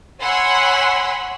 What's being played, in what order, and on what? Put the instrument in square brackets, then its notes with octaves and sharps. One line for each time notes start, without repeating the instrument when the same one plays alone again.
[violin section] C#5 F#5 G#5 B5 C6 E6